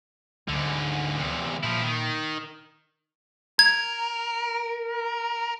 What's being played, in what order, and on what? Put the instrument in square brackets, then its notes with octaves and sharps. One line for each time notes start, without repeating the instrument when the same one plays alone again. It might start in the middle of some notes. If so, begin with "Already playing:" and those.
[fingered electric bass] D2 [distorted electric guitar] G#2 D3
[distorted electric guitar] E2 C3
[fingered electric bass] A#2 [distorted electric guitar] F3 E4
[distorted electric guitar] D#3
[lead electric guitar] A#4 [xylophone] G#6